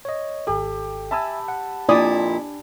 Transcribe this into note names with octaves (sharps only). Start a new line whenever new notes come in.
C#5 D#5
G#1 G4 A4
E5 G#5 A5 B5 E6
F#5
F2 A#2 D4 E4 D5 G#5 D#6